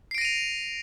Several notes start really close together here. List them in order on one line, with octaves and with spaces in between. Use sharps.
C7 D7 A#6 D#7 F7